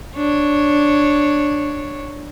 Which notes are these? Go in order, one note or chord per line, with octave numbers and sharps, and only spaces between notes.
D4 C#5